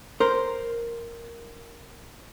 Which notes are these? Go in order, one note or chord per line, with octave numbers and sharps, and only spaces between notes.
A#4 C5